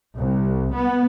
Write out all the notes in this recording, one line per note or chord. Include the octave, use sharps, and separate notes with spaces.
C2
B3